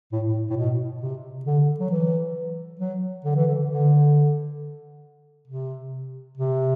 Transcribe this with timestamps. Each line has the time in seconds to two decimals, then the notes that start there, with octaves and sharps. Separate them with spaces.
0.12 A2
0.29 A2
0.50 A2
0.56 B2
1.01 C3
1.46 D3
1.80 F#3
1.91 E3
2.80 F#3
3.25 D3
3.36 E3
3.47 D3
3.69 D3
5.48 C3
6.37 C3